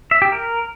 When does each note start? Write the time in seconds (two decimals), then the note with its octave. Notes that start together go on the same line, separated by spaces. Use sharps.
0.11 E5
0.22 G4
0.32 A#4